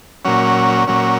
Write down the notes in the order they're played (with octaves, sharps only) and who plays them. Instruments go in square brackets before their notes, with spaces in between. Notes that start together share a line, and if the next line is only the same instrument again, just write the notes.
[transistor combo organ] A#2 F#3 C#4
A#2 F#3 C#4